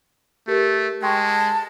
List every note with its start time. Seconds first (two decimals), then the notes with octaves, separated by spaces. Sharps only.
0.48 A3 G4 A#4
1.03 G#3 G5 A5 C6 C#6